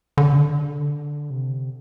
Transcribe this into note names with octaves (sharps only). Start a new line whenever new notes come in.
D3
C3
D3
C3